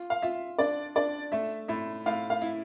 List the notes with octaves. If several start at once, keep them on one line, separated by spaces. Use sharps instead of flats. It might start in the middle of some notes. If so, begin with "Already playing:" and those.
Already playing: F4
F5
F4 E5
D4 D5
D4 D5
A3 E5
A2 E5
A2 F5
F5
E4